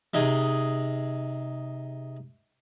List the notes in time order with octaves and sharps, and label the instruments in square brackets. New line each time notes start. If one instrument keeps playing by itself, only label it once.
[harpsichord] C3 D#4 G#4